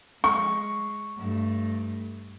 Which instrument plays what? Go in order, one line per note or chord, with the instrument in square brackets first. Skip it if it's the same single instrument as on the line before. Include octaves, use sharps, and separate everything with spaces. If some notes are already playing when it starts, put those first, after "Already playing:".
[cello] G#3 [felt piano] C#6
[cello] G2 A3